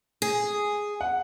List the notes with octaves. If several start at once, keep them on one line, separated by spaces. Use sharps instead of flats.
G#4
F#5